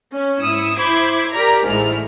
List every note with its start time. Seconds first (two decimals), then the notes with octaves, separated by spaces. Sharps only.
0.12 C#4
0.41 G#2 E4 D#6 E6 C#7
0.78 E4 C5 B5 D6 G#6
1.32 G4 A#4 D5 A#5
1.65 A1 G#2 G#3 A3 E4 F6